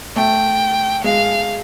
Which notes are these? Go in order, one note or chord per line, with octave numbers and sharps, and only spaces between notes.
A3 G5
G#3 F5